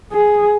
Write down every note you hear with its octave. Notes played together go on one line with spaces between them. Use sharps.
G#4